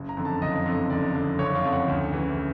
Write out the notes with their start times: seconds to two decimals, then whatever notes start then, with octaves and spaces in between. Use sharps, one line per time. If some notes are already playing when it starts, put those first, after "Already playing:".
Already playing: F#1
0.09 A#5
0.17 F2 D3
0.25 A5
0.41 F#1 D#5
0.66 F2 D3
0.90 F#1 D5
1.15 F2 D3
1.39 F#1 C#5
1.55 F5
1.64 F2 D3
1.72 F#5
1.88 D2
2.13 C#3 E3